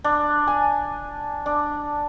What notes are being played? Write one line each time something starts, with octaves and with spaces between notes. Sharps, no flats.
D4
G#5
D4